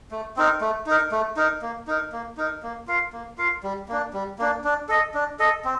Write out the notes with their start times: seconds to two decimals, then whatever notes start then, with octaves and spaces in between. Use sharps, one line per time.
0.11 A3
0.37 C4 D#4 A#4
0.61 A3
0.86 D#4 A#4
1.12 A3
1.37 D#4 A#4
1.62 A#3
1.87 D#4 A#4
2.12 A#3
2.37 D#4 A#4
2.63 A#3
2.87 F4 A#4 F5
3.13 A#3
3.38 F4 A#4 F5
3.63 G3
3.88 A#3 D4
4.13 G3
4.39 A#3 D4
4.64 D4
4.89 A4 D#5
5.14 D4
5.39 A4 D#5
5.64 C4